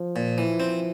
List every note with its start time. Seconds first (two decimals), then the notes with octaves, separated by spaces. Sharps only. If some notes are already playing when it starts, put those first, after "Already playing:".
Already playing: F3
0.16 A#2
0.38 E3
0.60 C4